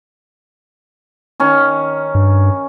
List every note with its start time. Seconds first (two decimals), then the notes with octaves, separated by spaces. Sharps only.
1.40 D#3 C#4
2.15 G2